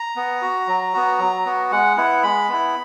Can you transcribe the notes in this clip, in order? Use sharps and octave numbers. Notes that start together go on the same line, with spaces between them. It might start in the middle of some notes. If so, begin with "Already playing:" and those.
Already playing: A#5
B3
F#4
F#3
B3 F#4
F#3
B3 F#4
G#3 F#5
B3 E4 F#5
G#3 B5
B3 E4